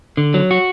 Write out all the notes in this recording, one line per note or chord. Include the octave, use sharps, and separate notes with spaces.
D3
F#3
F#4